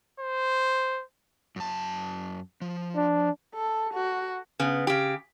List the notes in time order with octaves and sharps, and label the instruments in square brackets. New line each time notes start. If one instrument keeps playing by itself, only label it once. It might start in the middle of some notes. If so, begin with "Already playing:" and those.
[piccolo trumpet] C5
[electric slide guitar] F#2 A5
F3
[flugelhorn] D4
[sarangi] A4
F#4
[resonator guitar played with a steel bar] C#3 B3
C#3 G4